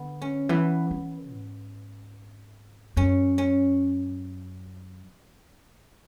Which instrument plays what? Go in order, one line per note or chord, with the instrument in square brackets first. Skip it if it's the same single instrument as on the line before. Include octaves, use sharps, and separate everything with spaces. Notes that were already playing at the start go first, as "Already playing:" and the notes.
Already playing: [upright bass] D3 [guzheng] B3
[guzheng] C#4
[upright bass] E3 [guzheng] B3
[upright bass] E3
G#2
[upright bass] F#2 [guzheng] C#4
[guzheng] C#4